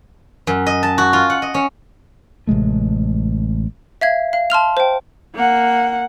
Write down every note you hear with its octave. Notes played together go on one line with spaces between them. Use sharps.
F#2
D#5
A5
F#4
F4
F#5
D#5
C#4
A1 C3 G#3 A3
E5 F5 G#6
F5
A5 C6 F6 F7
C5 G5
A#3 F#5